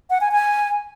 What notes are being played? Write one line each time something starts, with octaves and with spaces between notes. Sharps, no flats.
F#5
G#5
G#5